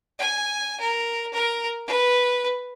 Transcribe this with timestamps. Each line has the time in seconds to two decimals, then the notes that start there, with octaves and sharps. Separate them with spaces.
0.19 G#5
0.80 A#4
1.33 A#4
1.87 B4